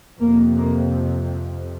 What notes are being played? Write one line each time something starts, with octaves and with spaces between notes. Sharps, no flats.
F2 C3 A#3
A#3